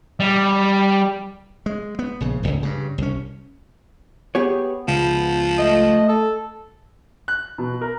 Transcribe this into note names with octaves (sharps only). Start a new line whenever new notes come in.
G3
G#3
B3
A#1 C#3
D#1 C#2
G2 C#3
C2 C#4
B3 G4 G#4 C#5
C#2 F3
A3 D#5
A4
F#6
B2
A#4